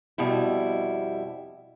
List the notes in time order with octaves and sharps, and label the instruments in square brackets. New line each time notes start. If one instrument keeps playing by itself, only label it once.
[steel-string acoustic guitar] F2 B2 G3 E4